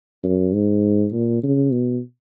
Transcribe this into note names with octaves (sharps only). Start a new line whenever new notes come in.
F#2
G#2
A#2
C#3
B2